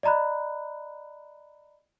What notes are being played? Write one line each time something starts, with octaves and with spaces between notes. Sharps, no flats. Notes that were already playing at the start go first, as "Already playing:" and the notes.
D5 D#5 A#5 B5 F#6